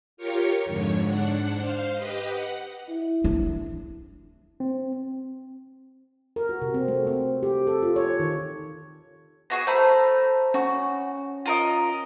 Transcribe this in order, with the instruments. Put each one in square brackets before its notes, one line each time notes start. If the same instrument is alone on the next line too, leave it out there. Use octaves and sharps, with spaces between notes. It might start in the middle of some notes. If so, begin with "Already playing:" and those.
[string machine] F4 G4 A#4 C#5 C#7
F2 G#2 D3 C#5
G#2 D4 F#5
C5 F5
G4 B4 D#5
F#5
[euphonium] E4
[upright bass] D4
[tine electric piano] C4
[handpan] A#4
F#4
C3
C4
A3
C4
G4
A4
F4
C#5
D#3
[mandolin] B3 F#4 G#4 [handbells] A#6
[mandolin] A3 [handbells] C5 A#5 B5
[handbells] C#4 [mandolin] F#4
[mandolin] F4 A#4 D#5